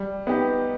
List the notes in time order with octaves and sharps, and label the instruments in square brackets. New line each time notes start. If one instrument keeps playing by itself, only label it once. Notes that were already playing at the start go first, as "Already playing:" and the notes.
Already playing: [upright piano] G3
B3 D#4 G4